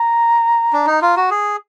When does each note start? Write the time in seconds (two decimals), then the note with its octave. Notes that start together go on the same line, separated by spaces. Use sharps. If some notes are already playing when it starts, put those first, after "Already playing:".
Already playing: A#5
0.73 D4
0.87 D#4
1.02 F4
1.17 F#4
1.31 G#4